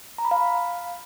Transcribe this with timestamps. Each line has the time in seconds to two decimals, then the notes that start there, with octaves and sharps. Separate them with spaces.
0.18 A#5
0.25 B5
0.31 F5